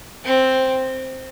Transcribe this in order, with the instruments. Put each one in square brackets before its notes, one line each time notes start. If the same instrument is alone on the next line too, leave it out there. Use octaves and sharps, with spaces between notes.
[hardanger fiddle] C4